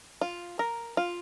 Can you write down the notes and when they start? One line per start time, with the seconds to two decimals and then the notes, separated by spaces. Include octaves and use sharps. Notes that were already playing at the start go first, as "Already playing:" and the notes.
0.21 F4
0.59 A#4
0.97 F4